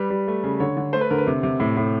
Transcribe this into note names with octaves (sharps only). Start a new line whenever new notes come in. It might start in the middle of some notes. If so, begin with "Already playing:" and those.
Already playing: G3 B4
G3
A3
C#3
D3 C#5
D3
A3 C5
B4
D3 A#4
B4
C3
C3
A2
A2